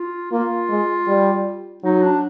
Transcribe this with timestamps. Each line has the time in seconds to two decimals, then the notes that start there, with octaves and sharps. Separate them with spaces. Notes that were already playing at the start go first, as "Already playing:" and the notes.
Already playing: F4
0.32 A#3 F4
0.70 G#3
1.07 G3
1.84 F#3 D#4
2.03 D4